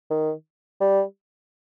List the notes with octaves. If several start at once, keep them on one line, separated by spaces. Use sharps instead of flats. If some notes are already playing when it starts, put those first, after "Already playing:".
D#3
G3